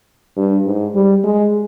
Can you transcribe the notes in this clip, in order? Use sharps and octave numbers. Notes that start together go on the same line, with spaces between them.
G2
G#2
G3
G#3